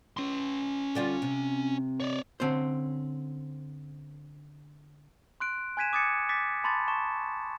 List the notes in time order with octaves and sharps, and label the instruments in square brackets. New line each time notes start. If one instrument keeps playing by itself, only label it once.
[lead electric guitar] C#4 C6
[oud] D3 G3 F4
C3
[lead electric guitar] C#5 D5
[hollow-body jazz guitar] D3 C4 C#4 C5
[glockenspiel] C6 F#6 D7
G#5 F#6 G#6 B6 D#7 E7
D6 D#6 G#6 A6 C#7
D6 A6 B6
A5 B5 C6 D6 A6
A5 C#6 E7